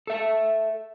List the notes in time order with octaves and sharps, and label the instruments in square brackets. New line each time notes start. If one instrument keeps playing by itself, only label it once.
[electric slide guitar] A4 E5